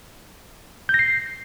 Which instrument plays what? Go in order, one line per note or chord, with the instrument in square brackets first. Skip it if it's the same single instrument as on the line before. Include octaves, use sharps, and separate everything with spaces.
[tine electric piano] G6
A#6
C7